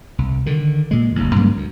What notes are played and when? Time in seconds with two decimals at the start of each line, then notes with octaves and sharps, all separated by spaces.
0.18 C2
0.46 D3 D#3
0.91 A#2 G#3
1.16 F#1 D#2
1.36 G2 F#3 A#3 C#4
1.57 D2